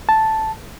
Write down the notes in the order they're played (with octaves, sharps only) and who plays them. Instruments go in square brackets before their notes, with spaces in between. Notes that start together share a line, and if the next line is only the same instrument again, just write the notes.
[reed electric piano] A5